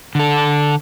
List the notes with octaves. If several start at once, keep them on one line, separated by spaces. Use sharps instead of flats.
D3 A4